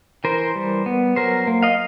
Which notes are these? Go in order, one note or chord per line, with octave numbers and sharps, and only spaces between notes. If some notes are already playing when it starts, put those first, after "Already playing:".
E3 A#4 C5
G3
B3
F#3 A#4 C5
A#3
D#5 F5